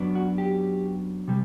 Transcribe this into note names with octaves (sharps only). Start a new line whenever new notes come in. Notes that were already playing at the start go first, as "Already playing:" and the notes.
Already playing: F#2 F#3 B3 D4
F#4
G4
C3 G3